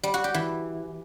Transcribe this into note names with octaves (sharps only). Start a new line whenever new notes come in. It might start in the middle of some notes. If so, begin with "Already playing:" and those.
G3
F#4
G4
E3